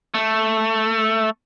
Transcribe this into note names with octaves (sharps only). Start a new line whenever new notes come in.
A3